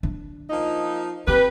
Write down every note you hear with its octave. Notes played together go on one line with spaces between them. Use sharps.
D4
F3 A#3 D#4
C4 G4 B4